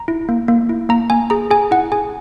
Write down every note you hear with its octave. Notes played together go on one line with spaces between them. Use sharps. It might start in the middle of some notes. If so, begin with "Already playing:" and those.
Already playing: A#5
E4
A#3
A#3
E4
A#3 A#5
A#3 G#5
G#4 A#5
G#4 G#5
E4 F#5
G#4 G#5